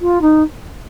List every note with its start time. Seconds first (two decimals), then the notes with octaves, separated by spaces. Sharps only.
0.01 F4
0.21 D#4